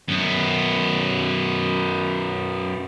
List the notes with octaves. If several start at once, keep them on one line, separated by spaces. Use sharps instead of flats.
F#2 B3